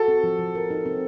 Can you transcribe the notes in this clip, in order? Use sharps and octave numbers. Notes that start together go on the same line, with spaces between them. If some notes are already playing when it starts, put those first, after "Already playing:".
Already playing: F#4 A4
C4
F3
F3
A#4
D#4
C4